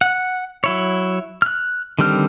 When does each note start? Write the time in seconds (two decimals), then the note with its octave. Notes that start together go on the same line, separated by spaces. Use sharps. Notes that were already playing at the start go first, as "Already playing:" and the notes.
0.01 F#5
0.64 F#3 E4 C#5
1.42 F6 F#6
1.99 D3 D#3 G3 C4 F6